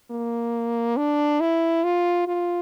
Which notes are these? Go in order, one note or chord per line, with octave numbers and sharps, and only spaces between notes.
A#3
D4
E4
F4
F4